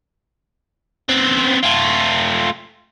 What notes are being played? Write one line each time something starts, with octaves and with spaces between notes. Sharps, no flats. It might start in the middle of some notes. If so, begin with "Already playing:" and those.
B3 C4
A3 F4